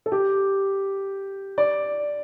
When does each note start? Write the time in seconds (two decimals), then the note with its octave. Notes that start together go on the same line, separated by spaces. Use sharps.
0.06 A4
0.12 G4
1.58 D5